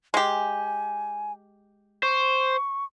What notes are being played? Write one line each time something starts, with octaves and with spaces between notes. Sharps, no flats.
G#3 G4 G#5
C5 C#6